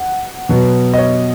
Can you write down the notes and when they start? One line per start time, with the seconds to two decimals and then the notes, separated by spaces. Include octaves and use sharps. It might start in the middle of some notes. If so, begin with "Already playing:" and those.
Already playing: F#5
0.49 B2 F#3 B3
0.94 D#5
0.98 C#5